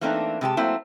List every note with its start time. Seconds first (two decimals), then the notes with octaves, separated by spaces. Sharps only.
0.01 E3 A3 A#3 C4 D4 D#4
0.41 C3 G#3 G4 A5
0.57 F#3 A3 A#3 C4 E4 C5